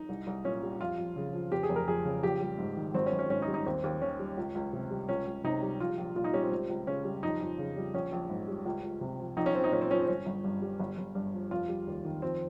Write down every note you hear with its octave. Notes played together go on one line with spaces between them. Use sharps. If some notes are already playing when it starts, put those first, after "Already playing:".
Already playing: D#4
C2
C2
A#2 C#4
G3
F2 F4
F2
C#3
F3
F1 G4
G#4
F1
A#4
F2 G#4
C#3
A#1 G4
G3
G#2
D#3
G#1 C4
C#4
G#1
C#4
G#2 C#4
D#4
G3
D#4
D#2 C4
D#2
D#3 C#4
G3
C#2
C#2
C3
G3
C#2 C#4
C#2
C3 D#4
G3
A#1 F4
A#1
A#2 F4
D#4
G3 C#4
C4
C#2
C#2
C#3 C#4
G3
F2 D#4
F2
C#3
G3
A#1 C#4
A#1
G#2
G3
C#2
C#2
C3
F3
A#1 D#4
C#4
A#1 C4
D#4
A#2 C#4
C4
F3 C#4
C4
G1 C#4
G1
G2
G3
G1
G1
G2
F3
F1 F4
G3
D#2
D#3
F2 C4